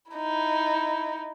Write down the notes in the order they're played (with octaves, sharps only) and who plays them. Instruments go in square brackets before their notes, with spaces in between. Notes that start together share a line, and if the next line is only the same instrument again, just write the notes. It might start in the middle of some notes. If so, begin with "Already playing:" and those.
[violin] D#4 E4